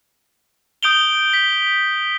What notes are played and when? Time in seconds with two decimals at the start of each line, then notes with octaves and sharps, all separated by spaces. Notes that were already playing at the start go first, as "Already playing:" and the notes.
0.83 D#6 G6 D7 F7 G7
1.33 B6